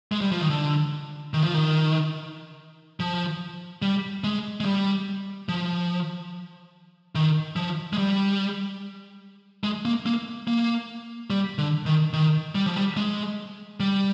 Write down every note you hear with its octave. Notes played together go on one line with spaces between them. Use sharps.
G#3
G3
F3
D#3
D3
D#3
F3
D#3
F3
G3
G#3
G#3
G3
F3
D#3
F3
G#3
G3
G#3
A#3
A#3
A#3
G3
D3
D#3
D#3
G3
F3
G3
G#3
G3